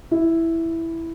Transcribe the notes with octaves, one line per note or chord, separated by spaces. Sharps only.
E4